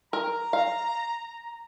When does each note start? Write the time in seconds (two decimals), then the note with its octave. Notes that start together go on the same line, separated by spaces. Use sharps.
0.13 A#4 A#5
0.53 F5